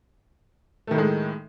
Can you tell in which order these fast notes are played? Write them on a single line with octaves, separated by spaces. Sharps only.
A3 D#3 A2 G#3